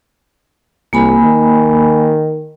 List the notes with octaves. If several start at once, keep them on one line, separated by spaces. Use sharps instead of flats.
C2 A#3 G#5 B5
D#3